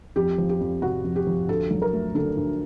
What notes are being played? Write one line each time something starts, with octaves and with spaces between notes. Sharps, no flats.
F2 G4
F3
G4
F2
C3 F#4
F2
G4
F3
D2 A4
F#3
A#4
A3
D3 A4
D2